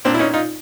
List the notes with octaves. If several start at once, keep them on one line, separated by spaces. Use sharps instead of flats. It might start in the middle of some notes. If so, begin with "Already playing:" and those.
A#2 C4 D4
E4
C#4 D#4
D#4 F4